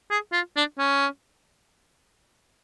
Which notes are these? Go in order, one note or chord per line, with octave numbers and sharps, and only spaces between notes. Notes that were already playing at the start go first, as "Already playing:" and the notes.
G#4
F4
D4
C#4